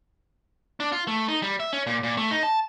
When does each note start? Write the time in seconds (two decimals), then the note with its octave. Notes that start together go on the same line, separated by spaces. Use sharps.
0.80 D4
0.92 F4
1.07 A3
1.28 D#4
1.42 G3
1.60 E5
1.73 C#4
1.87 A#2
2.03 A#2
2.17 A3
2.31 D#4
2.43 A5